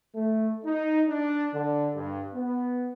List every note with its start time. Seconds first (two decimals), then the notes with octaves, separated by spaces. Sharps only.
0.16 A3
0.65 D#4
1.09 D4
1.54 D3
1.96 G2
2.34 B3